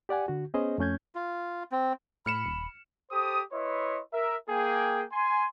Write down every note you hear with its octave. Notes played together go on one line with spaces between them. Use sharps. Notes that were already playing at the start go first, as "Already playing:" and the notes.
G4 D5 F#5 G#5
D3 F#4
B3 C#4 G#4 C5 D#5
F2 A3 C#4 G6 G#6
F4
C4
A2 B5 F6 C#7 E7
D#1
G4 A4 C5 D#6
E4 B4 C#5 D#5 E5 C6
A#4 E5
A#3 G#4 G5
G#5 C6